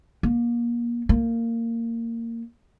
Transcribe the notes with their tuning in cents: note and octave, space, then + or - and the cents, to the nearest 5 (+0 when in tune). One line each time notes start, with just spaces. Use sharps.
A#3 +30
A#3 -20